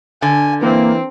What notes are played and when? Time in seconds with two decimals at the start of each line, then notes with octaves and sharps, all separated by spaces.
0.22 D3 G#5
0.63 E3 A#3 C4